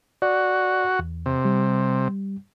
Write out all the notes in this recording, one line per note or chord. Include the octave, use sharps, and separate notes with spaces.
F#4 D5
E2
C3
G3